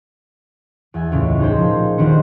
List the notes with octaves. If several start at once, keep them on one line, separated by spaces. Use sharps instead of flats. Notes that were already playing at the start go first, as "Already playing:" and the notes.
E2 E5 G#5
C#2 A2
D#4 G#4 C5 G5
A#2 F3
D#1 D#3 D4 B4 C5 C#7